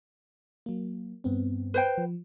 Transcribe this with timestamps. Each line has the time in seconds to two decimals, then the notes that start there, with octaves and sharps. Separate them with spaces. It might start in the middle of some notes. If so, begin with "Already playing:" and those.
0.66 F#3 A#3
1.24 G2 B3 C4
1.74 B4 C5 G5
1.98 F3